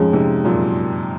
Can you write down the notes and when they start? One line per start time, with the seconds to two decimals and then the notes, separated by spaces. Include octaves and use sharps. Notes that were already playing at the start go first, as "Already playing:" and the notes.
Already playing: F2 G#2 F3 G#3 C#4 F4
0.13 G#2 C3
0.45 F#2 A#2